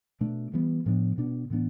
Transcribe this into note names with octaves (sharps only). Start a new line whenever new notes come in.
B2 A3 D4
E3 G3 B3
A2 F3 B3 D4
B2 B3 D4
A2 E3 B3 D4